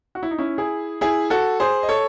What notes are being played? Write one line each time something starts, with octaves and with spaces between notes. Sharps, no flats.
F#4
E4
D#4
C#4 E4
E4 G#4
E4 G#4
F#4 A4
G#4 C5
D#5
A4 C#5